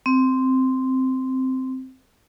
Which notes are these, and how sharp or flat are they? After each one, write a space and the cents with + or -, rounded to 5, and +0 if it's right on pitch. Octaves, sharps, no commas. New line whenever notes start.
C4 -5